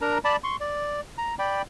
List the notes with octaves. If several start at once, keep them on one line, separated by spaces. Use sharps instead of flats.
D4 A#4 A#5
D5 A5 B5
C6 C#6
D5
A#5
D5 G5 B5